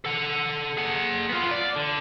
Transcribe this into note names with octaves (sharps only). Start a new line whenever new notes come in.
A4 F#5
G#4 F#5
B3 F4
D5
D3